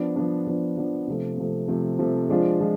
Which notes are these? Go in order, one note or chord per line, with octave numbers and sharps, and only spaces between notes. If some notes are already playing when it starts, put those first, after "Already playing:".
Already playing: F3 B3 D4
F3 B3 D4
F3 B3 D4
F3 B3 D4
C3 F3 A3
C3 F3 A3
C3 F3 A3
C3 F3 A3
F3 G#3 D4 F4
F3 G#3